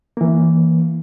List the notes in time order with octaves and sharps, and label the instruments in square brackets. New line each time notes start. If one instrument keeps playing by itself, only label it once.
[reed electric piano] E3 A#3